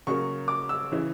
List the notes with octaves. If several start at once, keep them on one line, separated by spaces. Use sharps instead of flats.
C#3 F#3 A#3 C#6
D6
E6
C#3 E3